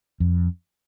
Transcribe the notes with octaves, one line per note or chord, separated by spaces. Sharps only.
F2